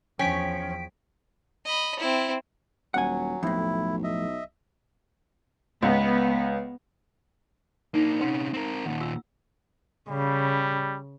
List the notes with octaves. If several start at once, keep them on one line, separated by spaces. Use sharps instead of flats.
E2 F3 C#4 G5 B6 D7
D#5 B5
C4 E4
D#1 F#3 F#5 G#5
B1 F2 A2 E4
D#5 E5
C#2 B3
A#3 D4 D#4
C3 C#4 B4 F#5 C6
C4 A#4
D#2 A#2 F#5
F4 E6
C#3 G3